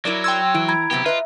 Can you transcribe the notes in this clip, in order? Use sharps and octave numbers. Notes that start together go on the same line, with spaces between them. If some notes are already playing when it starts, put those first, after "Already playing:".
F#3 E4 A#4 D5
G5 C6 E6 G#6
E3 E4 D7
A#5 B5 G#6
C3 F#3 B3 G4
F4 B4 D#5 E5